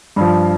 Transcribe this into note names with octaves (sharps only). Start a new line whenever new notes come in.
G2 F3